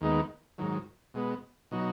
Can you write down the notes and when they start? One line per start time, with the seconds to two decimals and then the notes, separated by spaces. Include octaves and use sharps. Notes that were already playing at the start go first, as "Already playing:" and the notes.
0.01 D#2 D#3 G#3 B3 D#4
0.58 G#2 D#3 F#3
1.14 B2 G#3 B3
1.71 B2 F#3 D#4 F#4